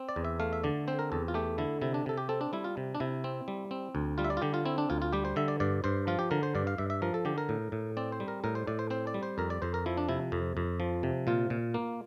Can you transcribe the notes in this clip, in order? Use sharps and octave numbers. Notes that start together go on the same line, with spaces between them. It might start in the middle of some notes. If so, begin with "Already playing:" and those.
Already playing: C4
D5
E2
E5
A3 F5
E5
D3 D5
C4 C5
A#4
E2 A4
F4
A3 G4
D3 E4
C3 E4
D4
C3 A4
G4
C4 A4
D4
G3 E4
F4
C3
D4
C3 E4
C4
G3
C4
D2
G3 F4
E5
D5
F4
D3 G4
F4
C4 E4
D4
D2 F4
F4
G3 G4
C5
D3 E5
D5
G2 D5
G2 C5
F3 F4
G4
D3 A#4
C5
G2 D5
F5
G2 E5
E5
F3 A#4
A4
D3 G4
A#4
A2
A2
C4 D5
C5
G3
A#4
A2 A#4
C5
A2 D5
C5
C4 C5
D5
G3
C5
F2 A#4
D5
F2 C5
A#4
F3 E4
D4
C3 E4
F2
F2
F3
C3
A#2 F4
A#2
A#3